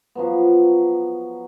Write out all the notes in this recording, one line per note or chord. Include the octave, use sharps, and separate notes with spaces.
F3 F#3 B3